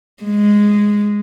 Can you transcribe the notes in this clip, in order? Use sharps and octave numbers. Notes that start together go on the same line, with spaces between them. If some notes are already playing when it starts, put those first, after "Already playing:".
G#3